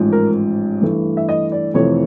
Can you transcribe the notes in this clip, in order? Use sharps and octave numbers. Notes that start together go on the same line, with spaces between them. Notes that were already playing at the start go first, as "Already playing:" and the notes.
Already playing: A1 G#2 F3
A#4
G2 E3 A3
E5
D#5
D5
F2 C3 E3 A3 C#5